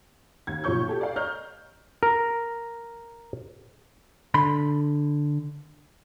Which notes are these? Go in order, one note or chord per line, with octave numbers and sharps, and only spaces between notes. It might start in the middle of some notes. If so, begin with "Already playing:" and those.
D#2 G#6
B1 A#2 F3 C#5 C#6 G6
G4 A4
D5 F5
C#5 D#5 A#5 F6 G6
A#4
D3 B5 C6